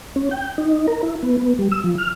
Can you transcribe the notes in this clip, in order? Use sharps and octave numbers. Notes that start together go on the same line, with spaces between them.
C#4
G5
D#4
A#4
E4
B3
B3
G3
E6
F3
F6